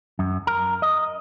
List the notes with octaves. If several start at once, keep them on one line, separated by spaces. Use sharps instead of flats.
F#2
A#4
D#5